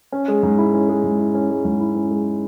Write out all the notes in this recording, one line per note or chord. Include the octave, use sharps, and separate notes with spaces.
C#4
G#3
G#2
E4
C#4
G#3
G#2
E4
C#4
G#3
G#2
E4
C#4
G#3